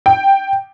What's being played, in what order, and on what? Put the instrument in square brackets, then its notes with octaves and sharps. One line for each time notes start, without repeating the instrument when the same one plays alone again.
[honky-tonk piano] G5